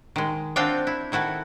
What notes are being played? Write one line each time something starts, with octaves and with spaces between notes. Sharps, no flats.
D#3 G#3
C4 D4 F4 F#4 F5 G5
E4
D#3 E4 F#4 A4